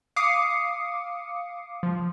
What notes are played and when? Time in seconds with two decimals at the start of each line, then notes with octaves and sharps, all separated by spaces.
0.16 F5 D6 D#6 C7 C#7
1.83 F3